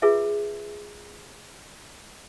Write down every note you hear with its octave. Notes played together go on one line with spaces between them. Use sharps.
F4 G#4 B4 E5